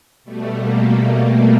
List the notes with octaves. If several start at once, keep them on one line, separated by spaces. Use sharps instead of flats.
B2 G3 A3
A#3
A3